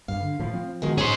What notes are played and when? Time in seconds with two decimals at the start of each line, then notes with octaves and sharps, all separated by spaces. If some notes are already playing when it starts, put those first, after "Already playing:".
0.08 G2 F5
0.21 D3
0.39 A2 E3 F3
0.53 F3 C4
0.82 B2 D#3 G#3
0.98 C#4 D#4 G#4 C5